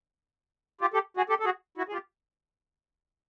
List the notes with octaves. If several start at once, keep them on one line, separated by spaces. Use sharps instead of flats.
F4 G4
G4 A4
F#4 G#4
G4 A4
A4
F#4 G#4
E4 F#4
G#4
F4 G4